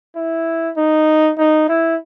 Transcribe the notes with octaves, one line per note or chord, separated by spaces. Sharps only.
E4
D#4
D#4
E4